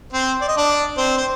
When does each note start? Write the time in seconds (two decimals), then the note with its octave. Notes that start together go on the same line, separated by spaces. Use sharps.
0.12 C4 C5
0.41 D5
0.48 D#5
0.57 D4 D5
0.97 C4 C5
1.18 C5